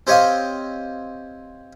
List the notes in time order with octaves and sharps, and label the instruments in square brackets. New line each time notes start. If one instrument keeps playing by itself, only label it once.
[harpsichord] C4 G4 C#5 D#5 F5